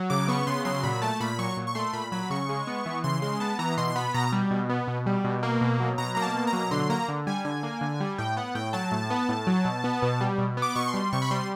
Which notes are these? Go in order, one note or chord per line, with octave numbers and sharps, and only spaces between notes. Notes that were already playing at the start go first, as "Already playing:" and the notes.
Already playing: F#3
C#3 D6
B3 C#6
C#3 C6
F#3 C6
A#2 B5
A3 A5
A#2 B5
F#3 C#6
A#2
C#6
A3 C6
A#2 B5
F#3 B5
C#3 C#6
G#3
B3
E3
C#3 C6
G#3 C6
B3 A5
E3 A#5
B2 C6
B3 B5
B2 A#5
G3
B2
B3
B2
G3
B2
A#3
B2
F#3
B2 A#5
A#3 A#5
A5
B2
A#5
F#3
D3 C6
A#3 A#5
D3
G3 G#5
D3 G#5
A#3
D3
G3
A2 G5
B3 F#5
A2 G5
F#3 A5
A2
B3
A2
F#3
B2
B3
B2
G3
B2
B3
D6
B2 C#6
C6
G3
C3 C#6
B5
G3 C6